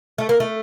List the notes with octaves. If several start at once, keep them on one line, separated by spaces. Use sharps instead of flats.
A3
A#3
A3